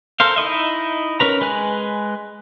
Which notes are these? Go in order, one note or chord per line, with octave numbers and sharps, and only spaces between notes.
A4 A#4 C5 F5
D#4 E4 D#5 E5
C#4 A#4 B4 A#5
G#3 B4 G#5 F#6